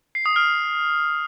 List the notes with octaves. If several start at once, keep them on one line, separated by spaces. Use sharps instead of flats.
C7
D#6
F6